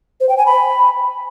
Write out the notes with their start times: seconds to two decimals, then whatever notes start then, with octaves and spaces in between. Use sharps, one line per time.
0.20 C5
0.29 G5
0.37 G#5
0.46 B5